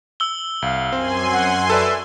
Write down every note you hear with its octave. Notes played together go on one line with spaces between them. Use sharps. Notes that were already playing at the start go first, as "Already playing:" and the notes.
E6 G7
C2 F5
F#2 C4 G#5 C6
F#5
A4 B4 D5 E5